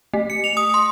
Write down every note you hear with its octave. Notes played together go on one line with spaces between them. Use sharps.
A3
C#7
F7
D#6
C6